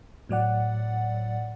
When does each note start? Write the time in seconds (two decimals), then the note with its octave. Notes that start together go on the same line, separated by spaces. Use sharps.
0.29 A2 F#3 D5 F#5